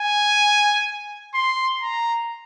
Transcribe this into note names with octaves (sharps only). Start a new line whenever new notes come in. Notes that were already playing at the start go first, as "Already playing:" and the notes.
Already playing: G#5
C6
A#5